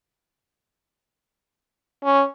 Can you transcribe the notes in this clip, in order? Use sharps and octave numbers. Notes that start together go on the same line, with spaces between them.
C#4